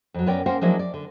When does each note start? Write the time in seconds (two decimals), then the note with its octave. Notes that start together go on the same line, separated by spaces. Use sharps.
0.14 F2 F#3
0.26 F#2 B3 C#4 A#4 D5 G5
0.46 A#3 C#4 A#4 C5 F#5 G5
0.61 F3 F#3 G#3 A#3 D4 E4
0.79 D5
0.94 D3